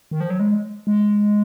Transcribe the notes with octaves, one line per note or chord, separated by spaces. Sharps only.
D#3
F3
F#3
G#3
G#3